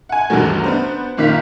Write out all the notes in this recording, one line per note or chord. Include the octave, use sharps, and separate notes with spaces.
F#5 G#5
D2 G2 D#3 E3 F#3 A3
B3 D4 C5
F#1 A#2 D#3 F5 B6